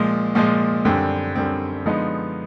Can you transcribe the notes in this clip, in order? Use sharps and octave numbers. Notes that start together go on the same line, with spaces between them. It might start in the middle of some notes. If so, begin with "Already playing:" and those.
Already playing: A#2 F3 G#3
A#2 F3 G#3
F#2 D3 G3 C4
F#2 D3 G3 C4
D3 F3 G#3 B3 D#4